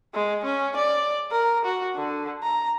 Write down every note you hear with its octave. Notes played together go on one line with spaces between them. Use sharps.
G#3
C#4
D5
A#4
F#4
D3
A#5